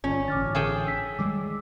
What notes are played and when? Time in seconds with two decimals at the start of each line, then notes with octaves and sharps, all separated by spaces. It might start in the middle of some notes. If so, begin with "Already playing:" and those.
0.04 G1 C#4 F4
0.28 A1 D3 D6 F6 A6
0.55 G#4 A4 G5
0.87 E6 B6
1.19 D#3 G3 G#3 D6 E6